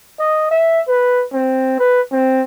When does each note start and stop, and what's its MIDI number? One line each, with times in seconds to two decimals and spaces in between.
0.19 0.49 75
0.51 0.80 76
0.88 1.24 71
1.33 1.79 60
1.79 2.01 71
2.12 2.43 60